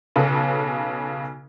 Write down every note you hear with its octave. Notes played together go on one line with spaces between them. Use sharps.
B1 C#3 A4 B4